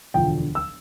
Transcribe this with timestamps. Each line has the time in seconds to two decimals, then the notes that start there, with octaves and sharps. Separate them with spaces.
0.14 E1 D2 D3 F3 G5
0.55 E6